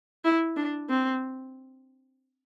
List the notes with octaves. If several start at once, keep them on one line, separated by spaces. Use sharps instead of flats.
E4
D4
C4